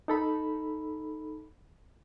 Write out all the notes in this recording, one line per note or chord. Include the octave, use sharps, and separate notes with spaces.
D#4 A4 B5